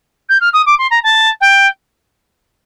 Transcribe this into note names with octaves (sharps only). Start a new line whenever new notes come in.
G6
F6
D#6
D6
C6
A#5
A5
G5